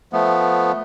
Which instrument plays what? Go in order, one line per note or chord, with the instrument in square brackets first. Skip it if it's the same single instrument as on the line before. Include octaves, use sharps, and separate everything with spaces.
[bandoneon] F3 A3 B3